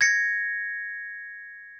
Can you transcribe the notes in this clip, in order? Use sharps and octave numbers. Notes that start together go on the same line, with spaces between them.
G#6 A#6 C#7